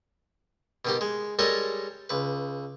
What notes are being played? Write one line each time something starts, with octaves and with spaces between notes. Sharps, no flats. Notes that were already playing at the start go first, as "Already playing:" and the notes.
B2 D#3 G4
G#3
G3 G#3 A4 A#4 C#5 D#5
C#2 B4